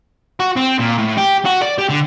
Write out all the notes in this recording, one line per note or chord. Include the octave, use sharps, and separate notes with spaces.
F#4
C4
A#2
A2
G4
F#4
D5
G4
D3